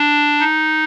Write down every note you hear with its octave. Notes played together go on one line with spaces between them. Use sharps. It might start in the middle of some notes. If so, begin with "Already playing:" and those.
Already playing: D4
D#4